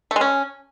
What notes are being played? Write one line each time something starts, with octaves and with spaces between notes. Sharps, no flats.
A3
G#3
C#4